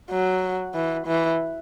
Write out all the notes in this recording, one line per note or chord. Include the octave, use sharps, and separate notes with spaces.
F#3
E3
E3